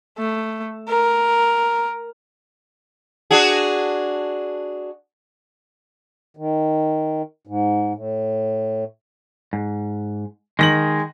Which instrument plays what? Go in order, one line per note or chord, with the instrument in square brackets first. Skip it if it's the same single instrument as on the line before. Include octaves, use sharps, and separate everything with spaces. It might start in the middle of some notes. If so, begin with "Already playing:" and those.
[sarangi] A3
A#4
[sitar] D4 F#4 G#4
[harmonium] D#3
G#2
A2
[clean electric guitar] G#2
[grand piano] D#3 A#6 F#7 [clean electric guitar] G#3